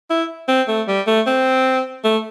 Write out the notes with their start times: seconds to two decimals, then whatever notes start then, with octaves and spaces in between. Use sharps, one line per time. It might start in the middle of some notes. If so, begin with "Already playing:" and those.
0.10 E4
0.48 C4
0.68 A3
0.88 G3
1.07 A3
1.27 C4
2.04 A3